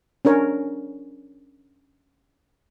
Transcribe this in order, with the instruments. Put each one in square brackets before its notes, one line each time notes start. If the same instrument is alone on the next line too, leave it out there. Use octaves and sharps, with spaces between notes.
[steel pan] C#4 D4 A#4 C#5